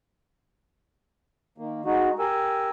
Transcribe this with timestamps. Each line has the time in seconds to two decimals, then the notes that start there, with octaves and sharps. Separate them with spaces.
1.58 D#3 A#3
1.85 G#3 D#4 F#4
2.19 G4 A#4 G#5 E6